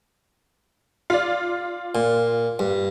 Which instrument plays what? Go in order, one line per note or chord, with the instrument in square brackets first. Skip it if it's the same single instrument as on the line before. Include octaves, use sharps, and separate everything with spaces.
[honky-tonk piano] F4 D5
[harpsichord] A#2
G2